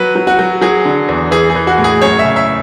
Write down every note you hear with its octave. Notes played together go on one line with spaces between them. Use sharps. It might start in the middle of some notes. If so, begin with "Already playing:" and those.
Already playing: F#3 B4
F#3
F#4
F#3
F#3 G#4
D3
E2
E3 G#4
G#4
E3
F#4
A2
G#4
F#2 C#5
E5
C#3
E5